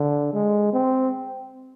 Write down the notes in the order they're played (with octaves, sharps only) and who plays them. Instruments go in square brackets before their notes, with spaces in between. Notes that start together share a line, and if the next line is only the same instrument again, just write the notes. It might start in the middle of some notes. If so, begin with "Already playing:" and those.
Already playing: [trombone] D3
G#3
C4